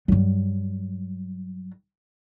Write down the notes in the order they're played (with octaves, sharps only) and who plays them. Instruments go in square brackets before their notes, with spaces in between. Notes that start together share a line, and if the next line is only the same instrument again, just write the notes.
[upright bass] G2 F#3